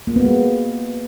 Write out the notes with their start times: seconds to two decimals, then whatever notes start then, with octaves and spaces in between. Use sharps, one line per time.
0.07 A#3
0.16 B3
0.25 G#3